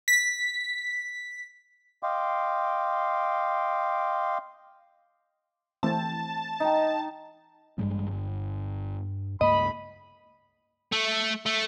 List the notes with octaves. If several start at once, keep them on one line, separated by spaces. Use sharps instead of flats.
B6
D#5 F5 G5 C6 D6
E3 A3 C4 A5
D#4 D#5 G5
A1 G2 G3 G#3
G1
C#2 G2 A#3 D#5 B5
A3
A3